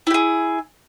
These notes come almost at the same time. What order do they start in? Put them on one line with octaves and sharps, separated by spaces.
E4 G4 G#4